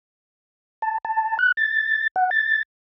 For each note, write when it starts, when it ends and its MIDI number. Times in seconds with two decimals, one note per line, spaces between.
0.82 0.98 81
1.05 1.38 81
1.39 1.52 90
1.57 2.08 93
2.16 2.30 78
2.31 2.63 93